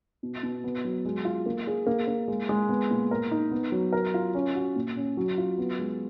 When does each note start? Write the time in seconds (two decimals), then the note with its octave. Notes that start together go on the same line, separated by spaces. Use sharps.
0.23 B2
0.43 B2
0.64 B3
0.85 F#3
1.05 G#3
1.25 F4
1.46 A#3
1.67 G#4
1.87 A#3
2.08 A#3
2.28 G#3
2.49 G#3
2.69 B3
2.91 A#2
3.11 A#4
3.31 D#4
3.51 B3
3.72 F#3
3.93 A#4
4.14 F4
4.35 C#4
4.55 F#4
4.76 A#2
4.97 C#4
5.17 F#3
5.38 F4
5.58 B3
5.79 G#3